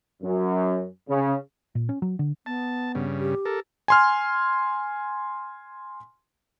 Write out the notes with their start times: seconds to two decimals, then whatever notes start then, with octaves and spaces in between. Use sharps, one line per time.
0.22 F#2
1.09 C#3
1.75 A#2
1.89 C#4
2.02 F#3
2.19 D3
2.46 B3 A5
2.95 G2 C#3
3.20 G4
3.45 A4 A#4
3.88 G#5 C6 F6